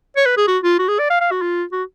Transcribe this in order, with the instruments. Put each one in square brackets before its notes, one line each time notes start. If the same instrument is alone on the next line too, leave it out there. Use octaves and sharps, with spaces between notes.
[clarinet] C#5
B4
G#4
F#4
F4
F#4
G#4
D5
F5
F5
F#4
F4
F#4